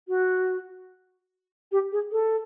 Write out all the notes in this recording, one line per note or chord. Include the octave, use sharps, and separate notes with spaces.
F#4
G4
G#4
A4